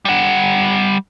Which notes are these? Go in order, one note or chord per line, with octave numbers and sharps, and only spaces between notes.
G3 F#5